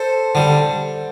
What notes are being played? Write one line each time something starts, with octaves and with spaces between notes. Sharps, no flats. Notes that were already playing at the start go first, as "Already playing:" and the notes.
Already playing: A4 C5
D3 G3